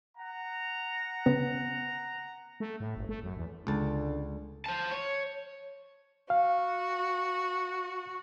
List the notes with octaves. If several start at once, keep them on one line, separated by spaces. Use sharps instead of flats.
F#5 A#5
C#3 B3
A3
A2
G1
A3
F#2
E2
C#2 D3 A5
C5 A5
C#5
F#4 F5